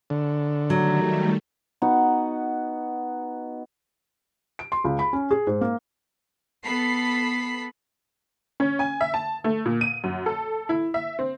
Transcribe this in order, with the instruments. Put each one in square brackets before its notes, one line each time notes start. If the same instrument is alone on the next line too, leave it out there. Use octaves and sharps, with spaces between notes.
[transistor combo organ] D3
[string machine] D#3 G3 A3 [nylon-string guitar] F#3
[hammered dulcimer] B3 D#4 F#4
[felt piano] D7
C6
C#2
B5
C#4
G#4
G#2
A#3
[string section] B3 A4 B5 C7
[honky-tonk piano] C#4
G#5
E5
A5
A3
A#2
D#7
F#2
A4
E4
E5
C4